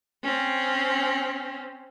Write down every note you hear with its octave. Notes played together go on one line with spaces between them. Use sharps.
C4 C#4